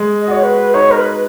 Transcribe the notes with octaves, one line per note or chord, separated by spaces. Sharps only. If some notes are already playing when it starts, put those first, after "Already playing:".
Already playing: G#3
D#5
F#4 C#5
B4
D#4 C#5
A#4
B4